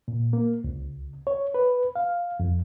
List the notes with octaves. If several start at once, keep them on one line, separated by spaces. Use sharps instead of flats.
A#2
A#3
C#2
C#5
B4
F5
F2